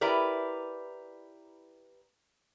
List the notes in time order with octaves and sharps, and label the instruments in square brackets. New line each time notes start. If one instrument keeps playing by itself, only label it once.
[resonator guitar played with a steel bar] E4 G4 A#4 B4 D5